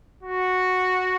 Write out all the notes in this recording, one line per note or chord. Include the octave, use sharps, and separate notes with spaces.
F#4